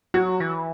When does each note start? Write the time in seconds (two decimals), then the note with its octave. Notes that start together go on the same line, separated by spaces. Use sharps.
0.14 F#3 F#4
0.40 E3